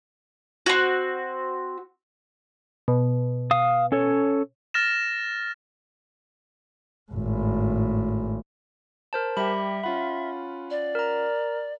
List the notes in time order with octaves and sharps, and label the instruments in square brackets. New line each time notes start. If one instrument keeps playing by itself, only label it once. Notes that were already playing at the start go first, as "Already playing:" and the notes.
[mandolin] C4 F#4
[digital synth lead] B2
[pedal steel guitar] F5 D#6
C#4 A4 C#5
[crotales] F6 A6 A#6 E7
[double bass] G#1 A2
[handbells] A#4 C5 A5
[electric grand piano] G3 G4 [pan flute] E5 [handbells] B5
[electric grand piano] C#4 F4 F#5 [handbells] B5
[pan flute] D5
[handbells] A#4 A#5